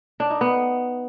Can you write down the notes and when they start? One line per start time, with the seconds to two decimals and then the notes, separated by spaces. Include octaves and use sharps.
0.20 D4
0.30 D#4
0.41 B3